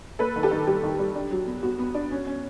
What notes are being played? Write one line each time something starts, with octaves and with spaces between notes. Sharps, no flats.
A#3 A4 B4
D#3
G4 A4
D#3
G3 G4
D#3
G3
D4
F#3
B3
B3 F#4
B3
D4
C#4
C#4